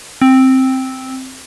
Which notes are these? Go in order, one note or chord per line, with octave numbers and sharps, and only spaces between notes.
C4